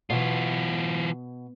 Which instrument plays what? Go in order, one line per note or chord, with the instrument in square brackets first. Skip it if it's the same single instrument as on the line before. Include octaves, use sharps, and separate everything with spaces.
[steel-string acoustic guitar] B2 [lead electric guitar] E3 F4